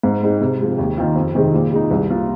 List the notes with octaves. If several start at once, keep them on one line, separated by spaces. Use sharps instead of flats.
G#2
G#3 C4 D#4
C3
F3 G#3
D#2
D#3 A#3 F4
F2
C3 D#3 G#3 C4
A#2
G#3 D#4
C2
A#2 A#3 F4